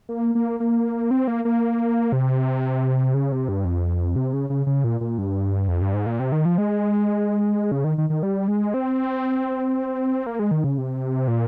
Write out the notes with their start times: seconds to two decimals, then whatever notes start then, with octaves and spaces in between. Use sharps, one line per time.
0.09 A#3
0.35 A#3
0.60 A#3
1.11 C4
1.28 A#3
1.45 A#3
2.12 C3
3.14 C#3
3.32 C3
3.49 G2
3.65 F2
4.16 C3
4.33 C#3
4.50 C#3
4.66 C#3
4.84 A#2
5.01 A#2
5.18 G2
5.68 F2
5.82 G2
5.94 G#2
6.06 A#2
6.20 C3
6.32 D#3
6.45 F3
6.58 G#3
7.72 C#3
7.84 D#3
7.98 D#3
8.10 D#3
8.23 G3
8.48 G#3
8.74 C4
10.26 A#3
10.39 G#3
10.51 D#3
10.64 C#3
10.78 C3
11.28 A#2